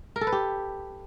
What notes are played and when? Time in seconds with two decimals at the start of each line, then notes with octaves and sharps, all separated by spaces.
0.16 A#4
0.21 A4
0.27 B4
0.32 G4